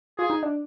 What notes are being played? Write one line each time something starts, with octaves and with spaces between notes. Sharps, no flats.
F4 G#4
D#4
D4